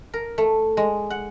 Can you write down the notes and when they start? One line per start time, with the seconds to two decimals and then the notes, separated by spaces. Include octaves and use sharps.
0.14 A#4
0.38 A3
0.77 G#3
1.10 F#5